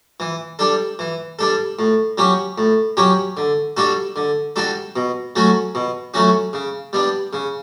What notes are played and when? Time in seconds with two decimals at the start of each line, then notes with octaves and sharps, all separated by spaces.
0.20 E3
0.59 G3 D4 A4
0.99 E3
1.39 G3 D4 A4
1.79 A2
2.18 F#3 C#4 G4 C#5
2.58 A2
2.97 F#3 C#4 G4 C#5
3.37 D3
3.77 G3 D4 F#4 A4
4.16 D3
4.56 G3 D4 F#4 A4
4.96 B2
5.36 F#3 A3 C#4 F#4
5.75 B2
6.14 F#3 A3 C#4 F#4
6.53 C#3
6.93 G3 B3 D4
7.33 C#3